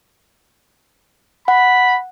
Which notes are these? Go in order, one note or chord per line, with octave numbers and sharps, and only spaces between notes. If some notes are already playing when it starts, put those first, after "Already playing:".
F#5 B5